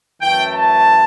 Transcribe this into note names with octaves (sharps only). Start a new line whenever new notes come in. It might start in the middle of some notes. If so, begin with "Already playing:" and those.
F#2 E3 A3 G5
A5